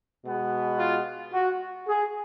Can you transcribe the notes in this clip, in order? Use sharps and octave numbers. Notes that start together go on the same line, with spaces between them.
B2 G#3 B3
F4
F#4
G#4